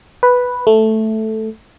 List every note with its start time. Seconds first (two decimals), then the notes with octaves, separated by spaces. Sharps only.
0.23 B4
0.67 A3